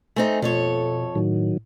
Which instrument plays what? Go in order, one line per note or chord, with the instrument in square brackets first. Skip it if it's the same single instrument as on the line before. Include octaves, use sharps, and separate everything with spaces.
[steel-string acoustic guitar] A3 C4 D#4 [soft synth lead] G#5
[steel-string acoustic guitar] F2 A4 C#5 [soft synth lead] B2
[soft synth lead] A2 [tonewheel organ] D#3 F#3